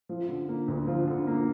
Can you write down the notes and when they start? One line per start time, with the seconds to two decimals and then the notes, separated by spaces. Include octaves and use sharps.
0.09 F3
0.29 D3
0.49 A#3
0.68 D2
0.87 F3
1.08 D3
1.27 A#3